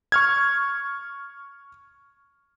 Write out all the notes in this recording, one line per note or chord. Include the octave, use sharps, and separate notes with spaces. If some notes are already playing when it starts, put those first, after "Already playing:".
C#6 F6 G#6